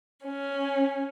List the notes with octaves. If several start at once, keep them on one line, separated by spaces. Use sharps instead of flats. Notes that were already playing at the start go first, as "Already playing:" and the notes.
C#4